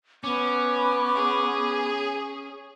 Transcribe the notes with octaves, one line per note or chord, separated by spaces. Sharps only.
B3 C#4 D6
G#4